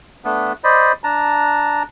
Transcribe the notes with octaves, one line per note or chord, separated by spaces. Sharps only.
A3 B3 D4
C5 D5 D#5 B5
D4 A5 A#5